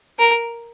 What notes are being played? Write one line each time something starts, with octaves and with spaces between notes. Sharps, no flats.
A#4